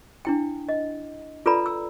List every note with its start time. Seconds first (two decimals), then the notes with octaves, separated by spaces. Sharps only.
0.25 D4 E4 G5
0.69 D#5
1.46 F4 A4 B4 D5 A#5 B5
1.66 E6